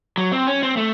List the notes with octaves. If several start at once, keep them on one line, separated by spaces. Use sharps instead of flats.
F#3
C4
C#4
C4
A3